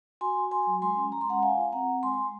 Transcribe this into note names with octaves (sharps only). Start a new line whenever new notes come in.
F#4 G#5 C6
F#4
F#4 G#5 C6
F#3
G#3 G#5 C6
C#4
G#3 A#5
C6
C#4 F#5 A#5
F4 F5 G#5
F4
C4 F#5 A#5
C4
G#3 G#5 C6
G#3